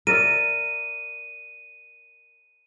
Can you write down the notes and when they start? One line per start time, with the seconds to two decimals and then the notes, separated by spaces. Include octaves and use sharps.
0.07 A#4 D5 E5 D#7